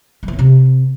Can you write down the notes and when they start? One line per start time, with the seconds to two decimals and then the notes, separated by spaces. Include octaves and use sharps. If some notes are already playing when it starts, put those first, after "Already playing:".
0.23 G3
0.28 E3
0.33 C#4
0.39 C3